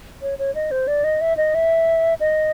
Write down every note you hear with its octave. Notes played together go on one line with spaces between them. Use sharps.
C#5
C#5
D#5
C5
D5
D#5
E5
D#5
E5
D#5